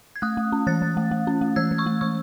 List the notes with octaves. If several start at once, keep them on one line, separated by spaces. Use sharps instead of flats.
G#6
A3 D#6 F#6
A3
C#4
E3 F#6 A6
E3
A3
A3
C#4
A3
E3 E6 G#6
E3
C#6 E6
A3
E3 C#6 E6